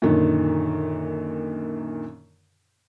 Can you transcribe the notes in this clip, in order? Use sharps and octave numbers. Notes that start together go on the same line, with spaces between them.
F#2 A#2 D3 D#3